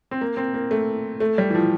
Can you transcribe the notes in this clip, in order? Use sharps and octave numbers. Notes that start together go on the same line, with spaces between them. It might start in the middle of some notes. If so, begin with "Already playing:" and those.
C4
A#3
C4
A#3
A3
A3
G3
E3
F3